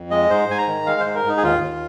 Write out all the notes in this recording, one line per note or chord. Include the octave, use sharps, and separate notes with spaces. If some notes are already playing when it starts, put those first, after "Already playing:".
Already playing: F2
G#3 D#5
G#2 C5
G#2 G#5
A#5
D#3
G#3 F5
G#2 C5
A#4
G#2 D#4
G#4
D#2 F4
D#2